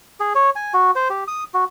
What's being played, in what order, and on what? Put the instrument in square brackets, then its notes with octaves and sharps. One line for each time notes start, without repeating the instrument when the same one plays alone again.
[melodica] G#4
C#5
G#5
F#4
C5
G4
D#6
F#4